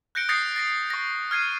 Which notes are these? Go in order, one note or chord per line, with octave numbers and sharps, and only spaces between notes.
F#6 G6 A#6 C#7 D7 G7
D#6 G6 A6 A#6 C7 C#7
A6 A#6 D7
C#6 A#6
F6 G#6 C7 D#7